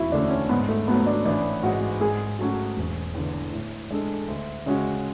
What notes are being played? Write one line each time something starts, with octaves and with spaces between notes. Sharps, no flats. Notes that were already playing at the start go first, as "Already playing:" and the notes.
Already playing: E1 E4 F#4
D2 D3 A3 C#4 D4
C#4
G#2 B3
A3
F#3 A3 B3
D4
A1 D4
G#2 G#3 F#4
G#2 G#4
F#3 A3 C#4 F#4
E1
E2 D3
A2
G#3 D4 A4
D2
C#3 G#3 C#4 F#4